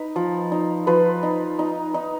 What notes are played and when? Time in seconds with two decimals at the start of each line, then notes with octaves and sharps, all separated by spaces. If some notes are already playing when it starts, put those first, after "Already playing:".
Already playing: D#4 B4
0.16 F3
0.52 D#4
0.87 F3 B4
1.23 D#4
1.59 D#4
1.94 D#4